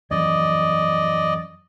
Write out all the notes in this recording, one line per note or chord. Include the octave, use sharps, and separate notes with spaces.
F#2 E3 F3 D5 D#5